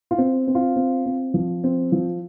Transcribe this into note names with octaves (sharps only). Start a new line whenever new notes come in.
F4
C4
C4
F4
C4
C4
F3
C4
F3